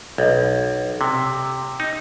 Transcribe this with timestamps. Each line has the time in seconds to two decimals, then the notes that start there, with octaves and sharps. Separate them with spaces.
0.18 B1
1.01 C3
1.80 D#4